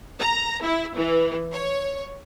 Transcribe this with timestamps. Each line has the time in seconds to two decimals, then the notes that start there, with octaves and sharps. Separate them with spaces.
0.20 A#5
0.64 E4
0.96 E3
1.52 C#5